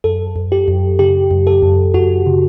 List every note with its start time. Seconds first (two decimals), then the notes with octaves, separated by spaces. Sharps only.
0.04 F#2 A4
0.36 F#2
0.52 G4
0.68 F#2
0.99 C#3 G4
1.31 F#2
1.47 A4
1.62 F#2
1.94 F#2 F#4
2.26 C#3